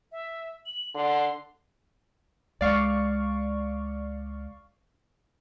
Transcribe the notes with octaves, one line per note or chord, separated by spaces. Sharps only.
E5
F#7
D3 C6
C#2 G#3 D5 F5 C#6